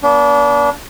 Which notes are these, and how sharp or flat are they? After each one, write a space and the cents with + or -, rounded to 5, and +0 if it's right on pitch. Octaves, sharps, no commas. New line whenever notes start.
A#3 +45 D4 -30